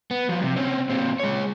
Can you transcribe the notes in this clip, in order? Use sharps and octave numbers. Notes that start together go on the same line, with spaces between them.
B3
F3 F#3
C3
C4 C#4
A#2 C4
G#3 C#5